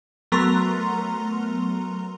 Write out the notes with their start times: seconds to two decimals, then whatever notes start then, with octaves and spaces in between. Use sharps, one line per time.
0.32 F#3 A3 B3 A#4 A#5 C6